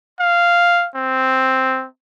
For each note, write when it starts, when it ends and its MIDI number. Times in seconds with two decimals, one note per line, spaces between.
0.20 0.87 77
0.95 1.86 60